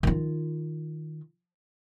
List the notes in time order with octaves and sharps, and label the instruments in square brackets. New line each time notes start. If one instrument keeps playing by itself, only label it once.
[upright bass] D#3 F4